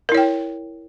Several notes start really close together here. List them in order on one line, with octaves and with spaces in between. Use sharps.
A#4 E4 C#5 G5